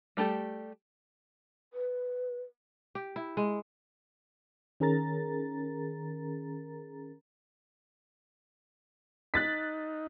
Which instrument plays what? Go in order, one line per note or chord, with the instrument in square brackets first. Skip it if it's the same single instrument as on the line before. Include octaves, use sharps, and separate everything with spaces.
[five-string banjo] G3 A3 G4 A4
[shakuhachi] B4
[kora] G4
E4
G#3
[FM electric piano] D#3 C#4 G#4 A#4 A#5 A6
[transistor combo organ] D#4 [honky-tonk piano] F#6 A6 B6